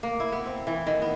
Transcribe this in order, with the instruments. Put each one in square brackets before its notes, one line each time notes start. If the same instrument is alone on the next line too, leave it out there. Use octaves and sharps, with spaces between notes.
[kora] A#3
E4
B3
C4
E3
D#3
B3